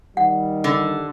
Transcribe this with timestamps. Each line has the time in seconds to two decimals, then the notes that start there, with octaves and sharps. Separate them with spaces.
0.17 D#3 G3 F#5
0.64 D3